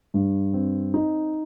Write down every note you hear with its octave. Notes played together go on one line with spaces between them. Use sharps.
G2
C4
D#4